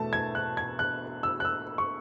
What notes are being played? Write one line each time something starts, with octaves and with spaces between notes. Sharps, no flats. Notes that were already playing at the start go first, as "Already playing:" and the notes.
Already playing: E2 B2 A3 E5 A5
G#6
F#6
G#6
F#6
E6
F#6
E6
C#6